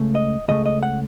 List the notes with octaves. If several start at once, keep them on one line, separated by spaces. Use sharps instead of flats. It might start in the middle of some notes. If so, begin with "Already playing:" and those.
Already playing: C#2 C#3 A3
D#5
C#2 C#3 A3 D#5
D#5
F#5